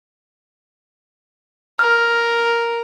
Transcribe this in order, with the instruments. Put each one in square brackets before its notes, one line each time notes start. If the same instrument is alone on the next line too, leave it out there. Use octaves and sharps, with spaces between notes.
[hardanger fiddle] A#4 [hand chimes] F6